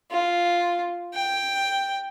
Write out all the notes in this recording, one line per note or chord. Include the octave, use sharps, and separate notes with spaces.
F4
G5